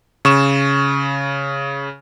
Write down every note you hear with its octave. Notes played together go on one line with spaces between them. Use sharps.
C#3 C#6 E7